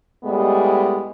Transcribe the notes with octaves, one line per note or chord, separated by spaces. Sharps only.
A2 G3 G#3 B3